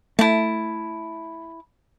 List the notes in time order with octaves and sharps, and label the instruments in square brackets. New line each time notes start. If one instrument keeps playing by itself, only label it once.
[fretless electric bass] A3 [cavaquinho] E4 A5